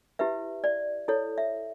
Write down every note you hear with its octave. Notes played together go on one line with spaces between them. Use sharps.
E4 G4 B4 E5
D5
E4 A4 C#5
E5